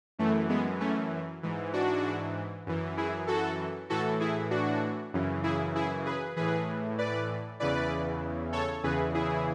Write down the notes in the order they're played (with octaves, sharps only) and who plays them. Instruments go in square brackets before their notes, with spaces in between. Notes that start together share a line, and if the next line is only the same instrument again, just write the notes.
[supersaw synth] F#2 E3 A3
G#3 B3
A3 C#4
G#2 E3
D4 F#4
F#2 E3
E4 G#4
F#4 A4
A2 E3 F#4 A4
E4 G#4
D4 F#4
F#2 C#3 E3
E4 G#4
E4 G#4
G#4 B4
A2 E3 G#4 B4
B4 D5
E2 C#3 E3 B4 D5
A4 C#5
E2 C#3 E3 G#4 B4
E4 G#4